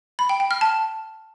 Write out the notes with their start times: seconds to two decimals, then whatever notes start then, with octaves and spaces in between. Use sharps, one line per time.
0.19 B5
0.29 G5
0.40 G5
0.51 F6
0.61 A5